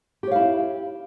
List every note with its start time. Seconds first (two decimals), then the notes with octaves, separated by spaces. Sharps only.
0.23 G4
0.27 C#5
0.31 F5
0.36 E4